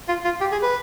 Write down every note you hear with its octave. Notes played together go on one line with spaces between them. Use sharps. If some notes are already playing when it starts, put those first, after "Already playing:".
F4
F4
G4
G#4
B4